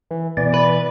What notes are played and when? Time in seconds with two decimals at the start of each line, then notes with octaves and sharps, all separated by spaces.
0.11 E3
0.37 B2 E3 D5
0.54 B4